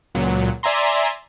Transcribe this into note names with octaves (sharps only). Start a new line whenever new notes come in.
C#2 A#2 F#3
D5 E5 G#5 A#5 C6